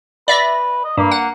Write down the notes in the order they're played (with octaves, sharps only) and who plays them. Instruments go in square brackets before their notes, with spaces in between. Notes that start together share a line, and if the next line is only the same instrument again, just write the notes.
[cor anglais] B4 [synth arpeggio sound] D5 E5 A#6
[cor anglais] D#5
[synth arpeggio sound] G2 [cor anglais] A#3
[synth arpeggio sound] F#5